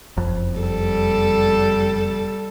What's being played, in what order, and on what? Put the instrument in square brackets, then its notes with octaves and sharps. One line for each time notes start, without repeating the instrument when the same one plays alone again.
[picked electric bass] F#1 F2
[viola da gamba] G3 A4